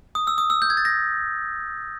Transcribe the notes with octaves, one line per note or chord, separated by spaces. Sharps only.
D#6
E6
D#6
E6
G6
G#6
A6
A#6